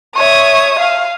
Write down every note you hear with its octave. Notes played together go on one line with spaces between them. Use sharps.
C#5 E5 D#6
F5